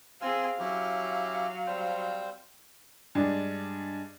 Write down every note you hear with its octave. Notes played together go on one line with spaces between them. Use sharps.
C4 F4 G#4 F5 G#5 E6
F#3 C#4 E4 G4
G3 C4 C5
G2 G#3 D4